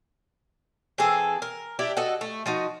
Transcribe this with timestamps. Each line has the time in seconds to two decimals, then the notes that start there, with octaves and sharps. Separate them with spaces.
0.98 E3 C4 G#4 A4
1.42 A#4
1.79 D4 E4 G4
1.97 F#4 A4 D#5
2.21 A3
2.46 F3 D#4 F#4